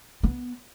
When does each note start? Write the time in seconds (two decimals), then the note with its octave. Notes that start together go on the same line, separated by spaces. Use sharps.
0.23 B3